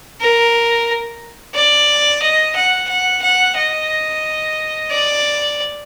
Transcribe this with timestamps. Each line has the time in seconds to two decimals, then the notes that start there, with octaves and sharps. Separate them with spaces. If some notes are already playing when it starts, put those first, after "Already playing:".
0.21 A#4
1.55 D5
2.22 D#5
2.56 F#5
2.89 F#5
3.23 F#5
3.57 D#5
4.91 D5